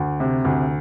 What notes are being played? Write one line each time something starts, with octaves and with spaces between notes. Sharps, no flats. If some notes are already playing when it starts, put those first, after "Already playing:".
Already playing: D2
C3
D2